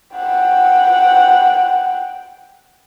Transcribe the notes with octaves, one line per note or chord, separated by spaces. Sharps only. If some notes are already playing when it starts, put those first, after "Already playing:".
F#5 G5